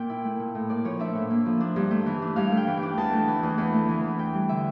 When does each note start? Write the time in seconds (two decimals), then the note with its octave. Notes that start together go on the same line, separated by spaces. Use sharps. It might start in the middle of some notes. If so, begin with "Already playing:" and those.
Already playing: A#2 G5
0.09 E4
0.24 A3
0.40 A#2
0.55 A2
0.70 A#3 D5
0.85 F3 C#5
0.99 D4 E5
1.15 A2
1.30 A#3
1.46 F3
1.60 D4
1.76 G2
1.91 A3
2.06 E3
2.22 D4
2.36 G2 F5
2.52 A3 G5
2.67 E3
2.77 G5
2.83 D4
2.98 E2 A5
3.13 A3
3.28 E3
3.43 E2
3.58 E2
3.74 A3
3.89 E3
4.03 E2
4.18 E2 G5
4.33 G3
4.49 D3 E5